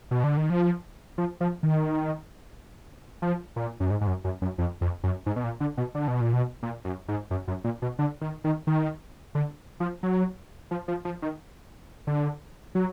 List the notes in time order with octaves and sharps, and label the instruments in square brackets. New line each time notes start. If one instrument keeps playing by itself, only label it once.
[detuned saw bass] B2
D3
D#3
F3
F3
F3
D#3
F3
A#2
F#2
G#2
G#2
F#2
F#2
F#2
F2
F2
F#2
G#2
B2
A#2
D3
B2
D3
B2
A#2
B2
A#2
F#2
G#2
F#2
F#2
A#2
B2
D3
D#3
D#3
D#3
D3
F3
F#3
F3
F3
F3
D#3
D3
F#3